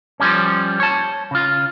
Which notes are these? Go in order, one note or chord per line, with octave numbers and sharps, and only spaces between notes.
F3 G3 C#4
C#5 A5
C#3 F4